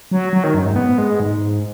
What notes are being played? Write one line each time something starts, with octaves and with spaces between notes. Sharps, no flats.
F#3
F#3
D#3
F#2
G#2
B3
G#3
G#2